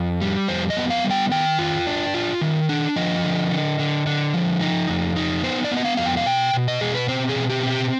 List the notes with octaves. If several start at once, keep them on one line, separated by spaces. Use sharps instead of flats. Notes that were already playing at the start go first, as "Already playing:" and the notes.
Already playing: F2
G3
F2 C5
D#5
B3
F5
G3
G5
D#3 G5
F4
D4
F4
D#3
D4
F3 D#5
D3
D3
D3
D3
F3
D#4
F2
D#4
B3 C5
D5
B3
D#5
F5
F2 F5
G5
F5
B2 G5
B2
D#5
B2 G#4
B4
C4 C5
G#4
B2
G4
C4
G4